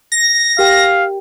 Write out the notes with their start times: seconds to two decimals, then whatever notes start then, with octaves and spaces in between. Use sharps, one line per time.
0.12 A#6
0.59 G4 A#4 F5 G5